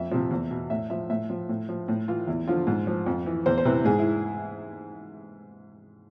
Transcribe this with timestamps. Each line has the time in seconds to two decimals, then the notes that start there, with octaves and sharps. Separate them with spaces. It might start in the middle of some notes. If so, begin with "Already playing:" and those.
Already playing: F2 E5
0.11 C3 F3
0.31 E2
0.51 B2
0.70 A2 E5
0.90 F3 E5
1.10 A2 E5
1.30 F3
1.49 A2
1.69 F3
1.88 A2
2.08 E3 F4
2.27 E2 E4
2.47 D3 F3 F4
2.67 G#2
2.87 F3
3.06 F2
3.26 E3
3.46 E2 C5
3.58 C5
3.65 C3 E3 B4
3.85 G#2 G#4
3.99 E4